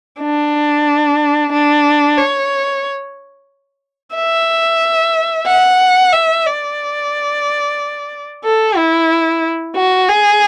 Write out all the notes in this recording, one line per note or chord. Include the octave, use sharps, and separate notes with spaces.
D4
D4
C#5
E5
F#5
E5
D5
A4
E4
F#4
G#4